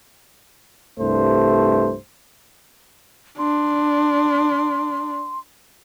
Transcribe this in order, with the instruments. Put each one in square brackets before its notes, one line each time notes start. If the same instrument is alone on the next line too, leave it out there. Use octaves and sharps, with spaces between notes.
[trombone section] C2 G2 A3 C5
[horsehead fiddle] D4 [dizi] C6